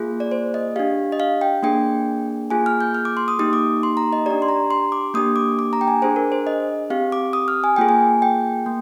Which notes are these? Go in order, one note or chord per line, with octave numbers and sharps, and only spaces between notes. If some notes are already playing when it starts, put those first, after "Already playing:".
Already playing: A#3 F4 G#4
D5
C5
D#5
D4 G4 F5
D#5
F5
G5
A#3 D4 G#4 G5
A#3 F4 G#4 G#5
F6
G6
F6
D6
C6
D#6
A#3 D#4 G4 D#6
D6
C6
A#5
D#5
D4 G4 D5
C6
A#5
C6
D6
A#3 D4 G4 D#6
D6
D6
A#5
G5
G#5
D4 G#4 C5
A#4
C5
D#5
C4 G4 F5
D6
D#6
F6
G#5
A#3 F4 G#4 G5
G#5
G5
A#3